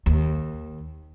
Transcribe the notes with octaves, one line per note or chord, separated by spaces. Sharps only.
D#2